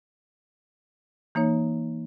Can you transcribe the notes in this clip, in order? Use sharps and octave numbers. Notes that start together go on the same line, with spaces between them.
E3 A#3 D#4 C#5